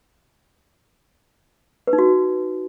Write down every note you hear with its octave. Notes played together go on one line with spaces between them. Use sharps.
B4
D#4
F#4